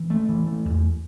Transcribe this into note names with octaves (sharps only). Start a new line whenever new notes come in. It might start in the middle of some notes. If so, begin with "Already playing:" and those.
Already playing: E3
A3
E3
A3
E2